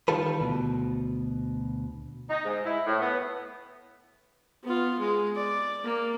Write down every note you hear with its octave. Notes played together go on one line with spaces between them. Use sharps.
D#3 E3 G3 F4 A4 B4
D2 B2
D#4
G#2
E4
A2
B3
B3 F4
G#3
D5
A#3